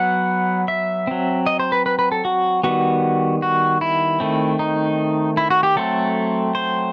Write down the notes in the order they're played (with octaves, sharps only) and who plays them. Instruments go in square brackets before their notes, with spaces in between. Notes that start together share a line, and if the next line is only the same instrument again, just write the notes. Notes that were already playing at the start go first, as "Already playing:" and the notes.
Already playing: [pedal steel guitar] F#3 B3 F#5
E5
F#3 C4
D#5
C5
B4
B4
B4
A4
F#4
D#3 G3 B3 F#4
F#4
E4
D#3 A3 C4
D#4
E4
F#4
G4
F#3 A3 C4 A4
C5